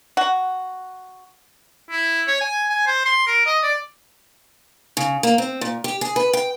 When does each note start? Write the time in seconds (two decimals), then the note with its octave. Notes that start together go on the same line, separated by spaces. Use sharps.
0.17 F#4
1.91 E4
2.27 C#5
2.41 G#5
2.70 G#5
2.87 C5
3.06 C6
3.27 A#4
3.46 D#5
3.63 D5
4.97 C#3
5.23 A#3
5.38 C4
5.61 A#2
5.84 G4
6.01 G#4
6.16 B4
6.33 G5